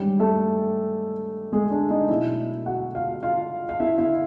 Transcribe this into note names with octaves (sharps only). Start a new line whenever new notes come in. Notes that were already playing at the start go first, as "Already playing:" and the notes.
Already playing: G2 D#3 G3 G#3 C#4 G4
A3 A4
G#3 G#4
D4 D5
D#4 D#5
B2 F#3 A3 E4 E5
F#4 F#5
F4 F5
F4 F5
F5
E4 E5
E4 E5